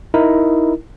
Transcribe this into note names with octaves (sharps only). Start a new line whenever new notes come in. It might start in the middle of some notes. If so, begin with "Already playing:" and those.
D#4 E4 A#4